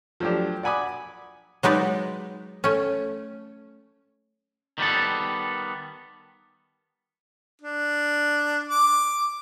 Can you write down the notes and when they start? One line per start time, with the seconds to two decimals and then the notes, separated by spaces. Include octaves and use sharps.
0.20 F3 F#3 A3 D4 G4
0.63 D5 F#5 G#5 B5 D6 D#6
1.63 F#3 G#3 D#4 B4 D5
2.64 A3 C#4
4.78 D#3 G3 B3 A4
7.62 D4
8.70 D6